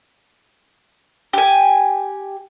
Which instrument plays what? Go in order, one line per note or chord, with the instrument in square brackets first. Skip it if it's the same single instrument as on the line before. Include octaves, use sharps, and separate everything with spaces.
[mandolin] G4 G#5